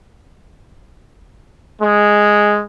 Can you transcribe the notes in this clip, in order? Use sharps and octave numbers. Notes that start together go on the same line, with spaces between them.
G#3